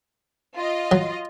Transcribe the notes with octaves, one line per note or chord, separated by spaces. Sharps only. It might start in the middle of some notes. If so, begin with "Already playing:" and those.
F4 D#5
F#3